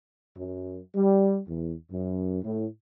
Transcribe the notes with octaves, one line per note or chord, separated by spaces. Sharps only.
F#2
G3
E2
F#2
A2